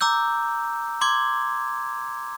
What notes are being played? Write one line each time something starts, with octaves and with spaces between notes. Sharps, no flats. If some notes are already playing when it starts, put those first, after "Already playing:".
A#5 D6 E6 G6
C6 D6 G#6